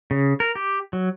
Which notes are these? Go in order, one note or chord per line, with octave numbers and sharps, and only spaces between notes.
C#3
A#4
G4
F#3